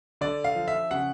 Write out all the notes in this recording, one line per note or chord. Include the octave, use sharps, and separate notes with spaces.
D3 D5
F5
F3
E5
C#3 F#5